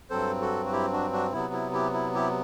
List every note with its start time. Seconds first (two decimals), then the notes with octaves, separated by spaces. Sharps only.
0.10 G2 F#3 C4 A4 C5
0.41 F#4 A4
0.66 F#4
0.72 E4 G4
0.92 D4 F#4
1.12 D4 F#4
1.33 C3 F#3 B3 E4
1.53 E4
1.73 E4 G4
1.94 E4
2.14 E4 G4